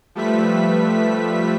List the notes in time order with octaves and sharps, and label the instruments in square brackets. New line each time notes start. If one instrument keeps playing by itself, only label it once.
[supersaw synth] F3 G3 A3 B4 E5 B6